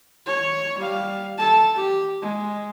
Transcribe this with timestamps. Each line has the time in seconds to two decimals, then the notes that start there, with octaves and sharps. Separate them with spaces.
0.26 C#5
0.78 G3 F5
1.38 A4 A5
1.75 G4
2.22 G#3